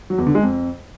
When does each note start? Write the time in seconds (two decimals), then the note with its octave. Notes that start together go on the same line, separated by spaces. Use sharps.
0.10 F#3
0.18 E2
0.27 D3
0.35 G#3
0.43 F2